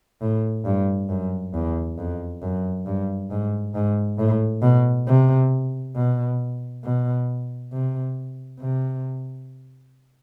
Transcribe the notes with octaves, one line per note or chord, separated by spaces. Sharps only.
A2
G2
F#2
E2
F2
F#2
G2
G#2
G#2
A2
B2
C3
B2
B2
C3
C3